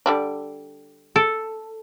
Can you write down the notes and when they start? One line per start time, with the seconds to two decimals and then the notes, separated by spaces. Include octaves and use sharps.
0.06 D3 G3 D4
1.16 A4